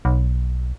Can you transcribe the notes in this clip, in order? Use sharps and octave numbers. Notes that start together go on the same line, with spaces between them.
B1